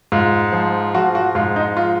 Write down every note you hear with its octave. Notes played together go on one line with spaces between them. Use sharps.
G#2 F4
F3
F3 F#4
F#4
G#2 F4
D#4
F4